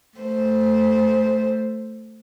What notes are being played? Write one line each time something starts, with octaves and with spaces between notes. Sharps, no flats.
A3 C5